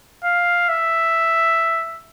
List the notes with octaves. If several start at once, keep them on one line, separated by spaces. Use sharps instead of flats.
F5
E5